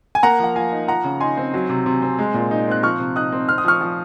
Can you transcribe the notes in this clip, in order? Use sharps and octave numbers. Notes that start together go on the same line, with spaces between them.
G#5
A#3 F#5 A#5
F3 F#5
F3 F5 G#5
D#4
F3 F#5 A#5
C#3
D#4 G#5 C6
C4
F#3
C3
C3
C4
G#3
A#2
D#4
C4 F#6
F3 C#6 F6
C3
D#4 D#6 F#6
C4
C4 F6
D#6
F3 C#6 F6
F3